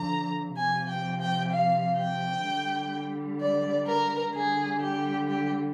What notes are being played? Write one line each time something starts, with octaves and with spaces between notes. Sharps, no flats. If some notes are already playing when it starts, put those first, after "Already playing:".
Already playing: D3 F3 A#5
C3 F3 G#5
G5
G5
F5
G5
D3 G3
D5
A#4
D3 G3 G#4
G4
G4